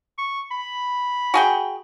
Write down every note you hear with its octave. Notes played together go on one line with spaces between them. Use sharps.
C#6
B5
F#4 G#4 G5